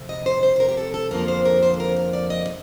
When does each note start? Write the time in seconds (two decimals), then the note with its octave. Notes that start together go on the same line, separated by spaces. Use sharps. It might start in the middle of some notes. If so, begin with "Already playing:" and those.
Already playing: F2 C3
0.09 D#5
0.26 C5
0.43 C5
0.56 C5
0.60 A#4
0.69 G4
0.77 A4
0.94 A4
1.11 F2 D3 F3 A#3 A#4
1.28 C5
1.45 A#4
1.63 C5
1.74 A4
1.80 A#4
1.96 A#4
2.13 D5
2.30 D#5
2.47 C3